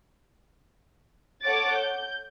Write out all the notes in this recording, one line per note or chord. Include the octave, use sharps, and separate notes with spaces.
A4 C#5 F#5 D6 A6
G6